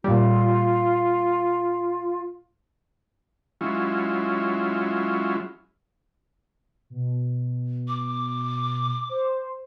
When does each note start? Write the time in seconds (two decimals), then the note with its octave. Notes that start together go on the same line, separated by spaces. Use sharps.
0.04 A#2 G3 F4
3.61 F#3 G#3 C#4 E4 F4
6.90 B2
7.88 D6
9.09 C5